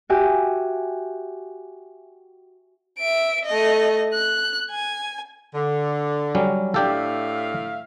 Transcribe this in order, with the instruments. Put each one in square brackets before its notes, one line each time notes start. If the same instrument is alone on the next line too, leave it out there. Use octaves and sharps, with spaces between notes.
[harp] F#4 G4 E5 G#5
[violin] E5 D7
A3 D#5
F#6
G#5
[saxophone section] D3
[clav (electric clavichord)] F#3 G3 C#4
[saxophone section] A2 E5 F5 [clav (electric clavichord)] D4 G4 A4